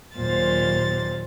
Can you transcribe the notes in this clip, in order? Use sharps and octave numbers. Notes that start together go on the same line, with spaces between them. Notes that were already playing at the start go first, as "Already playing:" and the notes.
D#2 A#2 F#3 F4 C5 A6